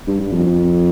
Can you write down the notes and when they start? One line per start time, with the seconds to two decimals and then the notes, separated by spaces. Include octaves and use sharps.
0.07 G2
0.20 G2
0.33 F2
0.46 F2